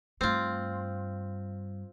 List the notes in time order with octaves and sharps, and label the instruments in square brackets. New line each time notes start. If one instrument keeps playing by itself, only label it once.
[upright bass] G2 A3 [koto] C4 F4